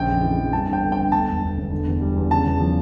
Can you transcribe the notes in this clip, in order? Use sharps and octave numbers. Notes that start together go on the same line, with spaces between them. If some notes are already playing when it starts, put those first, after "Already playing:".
Already playing: A#1 C#3 G5
F2
E3
F2
G2 A5
G1 G5
D3
G1 G5
D2 A5
E1
D3
E1
D3
E2
G3
E2
C#3 A5
E2
F3